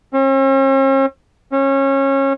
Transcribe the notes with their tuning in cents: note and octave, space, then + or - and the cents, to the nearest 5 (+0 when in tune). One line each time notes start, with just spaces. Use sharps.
C#4 -45
C#4 -25